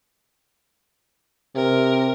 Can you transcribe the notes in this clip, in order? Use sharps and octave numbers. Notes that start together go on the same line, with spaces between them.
C3 A#4